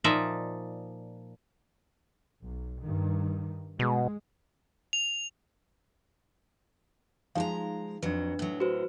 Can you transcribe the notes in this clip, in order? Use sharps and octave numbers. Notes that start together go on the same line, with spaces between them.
A#2 F3 D#4 D5 E5
B1
G2 D#3
B2 G#3
F7
F3 G#3 D#4 F5 A#5
F2 F#3 D4 B4
A2 F#3
F#4 B4 C5